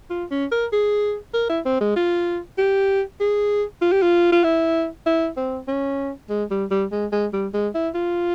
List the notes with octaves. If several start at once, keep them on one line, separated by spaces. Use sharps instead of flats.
F4
C#4
A#4
G#4
A#4
E4
C4
G#3
F4
G4
G#4
F4
G4
F4
F4
E4
E4
C4
C#4
G#3
G3
G3
G#3
G#3
G3
G#3
E4
F4